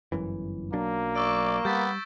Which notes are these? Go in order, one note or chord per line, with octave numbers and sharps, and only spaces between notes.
G1 F#2 E3
B1 F#3 A#3 D4
D5 C#6 E6 D7
G3 B3 G6 A6 B6